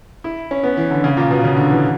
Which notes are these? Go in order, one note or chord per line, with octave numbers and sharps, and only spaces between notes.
E4
C#4
B3
E3
D3
C#3
A#2
B2
C#3
D3
E3